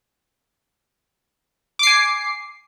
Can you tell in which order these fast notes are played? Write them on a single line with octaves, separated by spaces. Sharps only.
D6 C7 G#5